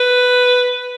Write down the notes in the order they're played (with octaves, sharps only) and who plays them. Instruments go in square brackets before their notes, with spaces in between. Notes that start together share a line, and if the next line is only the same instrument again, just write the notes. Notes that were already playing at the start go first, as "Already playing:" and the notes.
Already playing: [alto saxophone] B4